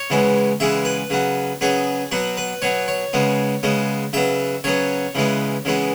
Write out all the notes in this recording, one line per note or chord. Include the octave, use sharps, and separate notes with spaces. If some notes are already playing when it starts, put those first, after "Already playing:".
Already playing: C#5
C#3 E3 G#3 B3
C#3 E3 G#3 B3 E5
B4
C#3 F#3 B3
C#3 F#3 B3 G#4
B2 F#3 B3 F#4
B4
B2 F#3 B3 C#5
C#5
C#3 G#3 B3
C#3 G#3 B3
C#3 F#3 B3 E5
C#3 F#3 B3 C#5
C#3 E3 G#3 B3
C#3 E3 G#3 B3